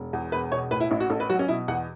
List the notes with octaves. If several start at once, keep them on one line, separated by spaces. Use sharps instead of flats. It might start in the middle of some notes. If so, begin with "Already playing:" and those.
Already playing: E1
E2
E1 B4
B2 C#5
A2 B4
E4
A1 E4
F#4
A1 A4
B4
F#3 F#4
C#4
B2 E4
E2 F#5